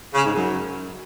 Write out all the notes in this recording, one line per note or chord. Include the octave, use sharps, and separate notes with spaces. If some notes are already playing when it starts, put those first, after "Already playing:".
C#3
G#2
F#2